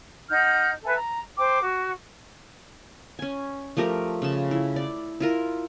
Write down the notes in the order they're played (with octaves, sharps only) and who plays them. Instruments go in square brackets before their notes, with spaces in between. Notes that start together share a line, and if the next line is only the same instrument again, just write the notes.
[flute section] D#4 F#5 F6 G6
A4 B4 E5 G#5
A#5
C5 G5 D6
F#4
[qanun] C#4 G#5
F3 A3 G4 A#4
C#3 A5
E4
D5
E4 F4 A#4